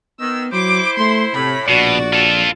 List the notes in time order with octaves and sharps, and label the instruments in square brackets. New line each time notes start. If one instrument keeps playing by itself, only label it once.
[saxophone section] D#3 [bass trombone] B3 [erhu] E6
[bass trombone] F#3 [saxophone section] E4 C5 [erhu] D6
[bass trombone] A3 [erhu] C6
[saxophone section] A2 [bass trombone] C3 [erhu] B5
[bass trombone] A#1 [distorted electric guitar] B2 [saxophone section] F#4 [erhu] D5
[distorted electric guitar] F4 A4